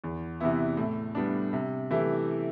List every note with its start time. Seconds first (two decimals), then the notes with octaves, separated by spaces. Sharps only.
0.04 E2
0.40 C3 E3 B3 E4
0.77 A2
1.15 G3 B3 D4
1.53 C3
1.91 E3 A3 E4 G4